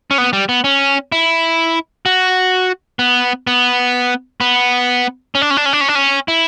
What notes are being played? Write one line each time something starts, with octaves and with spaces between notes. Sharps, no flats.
C#4
B3
G3
B3
C#4
E4
F#4
B3
B3
B3
C#4
D4
C#4
D4
C#4
D4
C#4
D4
C#4
E4